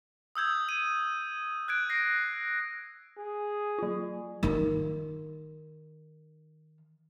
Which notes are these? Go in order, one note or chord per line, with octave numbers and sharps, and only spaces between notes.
D#6 E6 G6 G#6
D#7
F#6 G#6 D7
A#6 C7
G#4
F#3 F4
D#3 F4